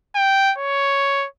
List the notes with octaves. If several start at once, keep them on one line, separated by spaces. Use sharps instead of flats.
G5
C#5